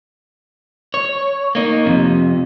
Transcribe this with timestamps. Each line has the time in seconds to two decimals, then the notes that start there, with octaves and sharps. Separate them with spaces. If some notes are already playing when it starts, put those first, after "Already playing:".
0.94 C#5
1.55 A#3 D#4
1.86 F2 C3